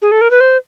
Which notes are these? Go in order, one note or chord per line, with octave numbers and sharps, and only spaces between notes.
G#4
A4
A#4
B4
C5